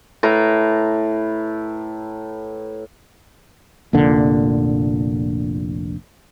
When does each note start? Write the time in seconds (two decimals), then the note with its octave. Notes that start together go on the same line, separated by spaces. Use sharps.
0.23 A2 B4 A#5
3.93 F1 A#1 A#2 D3